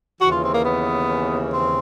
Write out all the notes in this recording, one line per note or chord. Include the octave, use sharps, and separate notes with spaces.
D#2 C#3 E3 F#4
F4
C4
A#3
B3
C4